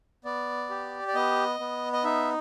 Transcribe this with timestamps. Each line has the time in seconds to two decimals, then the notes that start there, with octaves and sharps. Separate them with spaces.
0.25 B3 D5
0.70 G4
1.08 D5
1.14 B3 D#5
1.60 B3
1.93 D#5
2.04 D#4 E5